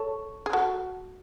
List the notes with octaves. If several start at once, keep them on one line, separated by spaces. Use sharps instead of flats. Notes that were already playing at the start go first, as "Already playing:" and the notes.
Already playing: A4 C#5
G#4
F#4 A4